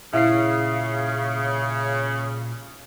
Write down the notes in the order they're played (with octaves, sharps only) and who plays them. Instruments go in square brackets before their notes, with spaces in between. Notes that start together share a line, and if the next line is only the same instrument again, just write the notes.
[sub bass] A#2 [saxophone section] C#3 [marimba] E4 [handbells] E5 F5 C7